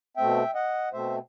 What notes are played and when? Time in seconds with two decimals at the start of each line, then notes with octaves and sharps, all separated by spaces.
0.17 B2 A3 C4 E5 G5
0.55 D#5 F#5
0.93 B2 A3 C4 C5 E5